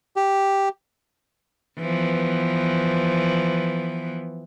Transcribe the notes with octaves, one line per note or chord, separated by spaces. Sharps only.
G4
E3 F3 B3